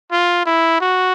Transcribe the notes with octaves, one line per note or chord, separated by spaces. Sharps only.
F4
E4
F#4